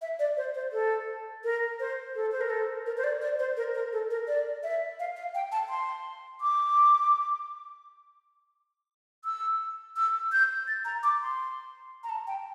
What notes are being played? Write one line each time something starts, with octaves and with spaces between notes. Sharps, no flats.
E5
D5
C5
C5
A4
A#4
C5
A4
C5
A#4
A4
A#4
C5
D5
D5
C5
A#4
A#4
A4
A#4
D5
E5
F5
F5
G5
A5
C6
D6
E6
E6
G6
A6
A#5
D6
C6
A#5
A5
G5